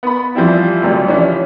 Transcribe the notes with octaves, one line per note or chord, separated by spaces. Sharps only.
B3 B5
E3 F3 G3 C4 E4
A1 D2 C3 F#3 G3
E3 F3 C#4 D4